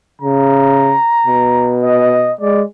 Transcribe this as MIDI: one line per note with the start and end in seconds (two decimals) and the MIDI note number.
0.21 0.95 49
0.21 1.75 82
1.27 2.32 47
1.84 2.33 75
2.41 2.63 56
2.41 2.63 74